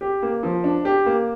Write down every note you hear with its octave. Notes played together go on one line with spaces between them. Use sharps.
G4
A#3
F3
D4
G4
A#3